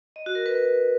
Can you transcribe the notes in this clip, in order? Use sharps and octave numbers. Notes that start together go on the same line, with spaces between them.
D#5
F#4
A#4
B4